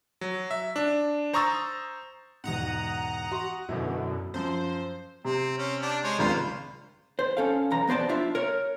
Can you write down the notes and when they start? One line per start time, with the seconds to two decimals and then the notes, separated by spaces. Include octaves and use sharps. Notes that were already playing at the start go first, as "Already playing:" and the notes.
0.21 F#3
0.51 E5
0.76 D4
1.33 C5 A#5 C#6 D#6 E6 A6
2.44 E1 G#2 F#5 A#5 D#6
3.31 F#4 C6
3.69 F#2 B2 D3 E4
4.34 F#2 F3 C5
5.25 C3 C4
5.58 C4 C#4
5.82 D4 G4
6.04 G#3 C5 C#5
6.19 G#1 C#2 F4 B4 C5
7.19 C5
7.37 C#4 A4 F5
7.71 B1 E2 A#5
7.87 B1 B3 C5 D5 A5
8.09 D4 F4 E5
8.35 A#4 C#5